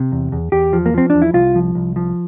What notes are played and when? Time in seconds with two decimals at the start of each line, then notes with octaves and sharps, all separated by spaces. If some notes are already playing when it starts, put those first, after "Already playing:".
Already playing: C3
0.12 E2
0.32 E2
0.52 E2 G4
0.73 F3
0.86 A#3
0.94 F3 C4
1.10 E2 D4
1.22 E4
1.34 C2 F4
1.55 F3
1.75 C2
1.96 F3